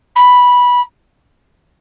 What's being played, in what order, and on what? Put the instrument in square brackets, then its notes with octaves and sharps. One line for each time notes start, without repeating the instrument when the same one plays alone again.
[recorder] B5